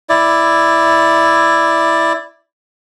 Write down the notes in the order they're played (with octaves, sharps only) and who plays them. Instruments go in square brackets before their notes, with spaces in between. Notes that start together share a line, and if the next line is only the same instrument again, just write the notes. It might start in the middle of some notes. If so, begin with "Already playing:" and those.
[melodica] E4 D5